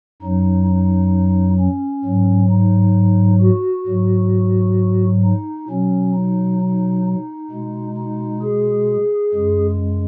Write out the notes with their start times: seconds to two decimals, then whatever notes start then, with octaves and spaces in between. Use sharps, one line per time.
0.22 F#2 F#3 D#4
0.67 D#4
1.59 C#4
2.04 G#2 F#3
2.50 D#4
3.41 F#4
3.87 G#2 F#3
5.24 D#4
5.69 B2 F#3 C#4
6.14 D#4
6.61 D#4
7.05 D#4
7.51 B2 G#3
7.97 D#4
8.42 G#4
9.33 F#2 C#3 G#3